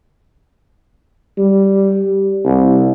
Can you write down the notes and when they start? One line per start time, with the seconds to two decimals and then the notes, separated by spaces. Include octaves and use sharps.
1.38 G3
2.45 C2